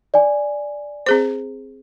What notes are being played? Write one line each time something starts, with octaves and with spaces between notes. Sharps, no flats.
D5 G#5
C4 G#4 C5